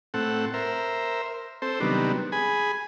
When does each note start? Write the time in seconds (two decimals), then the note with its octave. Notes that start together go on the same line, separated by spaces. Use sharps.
0.14 A2 C4 A4 F#5
0.54 A#4 C5 E5
1.62 C4 A4 C5
1.80 C3 D#3 F#3 G3 B3 D4
2.32 G#4 G#5 B5